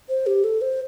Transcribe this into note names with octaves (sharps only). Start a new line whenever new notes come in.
C5
G4
A4
C5